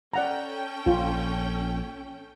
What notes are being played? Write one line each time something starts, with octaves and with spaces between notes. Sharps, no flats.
C#4 A4 D5 F#5 G5 A#5
A#1 F4